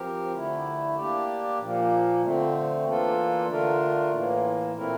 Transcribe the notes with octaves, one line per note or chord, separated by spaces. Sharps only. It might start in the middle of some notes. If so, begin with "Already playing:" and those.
Already playing: F3 C4 G4 A#4
D3 A3 E4
A#3 D4 G4 D5
A#2 F3 A#3
D3 A3 C4
E3 A#3 D4 F4 A4
D3 A3 D4 F4 A#4
A2 E3 A#3
A#2 A3 C4 E4 A#4